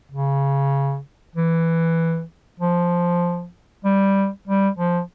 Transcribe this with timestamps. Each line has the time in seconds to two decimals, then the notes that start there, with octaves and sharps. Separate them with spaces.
0.11 C#3
1.35 E3
2.60 F3
3.84 G3
4.47 G3
4.78 F3